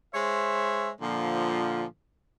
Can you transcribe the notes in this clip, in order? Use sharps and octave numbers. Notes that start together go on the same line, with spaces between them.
G#3 C5 C#5 E5
A#2 D3 F3